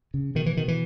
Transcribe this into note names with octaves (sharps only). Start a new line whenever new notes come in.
C#3
B2 D#3
E3
B2 D#3
E3